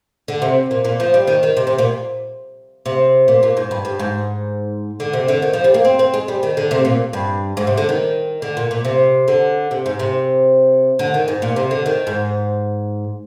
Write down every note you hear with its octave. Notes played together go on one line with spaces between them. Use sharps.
D3
C3
A#2
A#2
F3
G3
D#3
D#3
C3
C3
A#2
C3
A#2
A#2
G#2
G2
G2
G#2
D3
C3
D3
D#3
F3
G3
A#3
C4
C4
G#3
G3
D#3
D3
C3
A#2
G2
G#2
C3
D3
D#3
D3
A#2
A#2
C3
D3
C3
G#2
C3
D3
D#3
G#2
A#2
C3
D3
D#3
G#2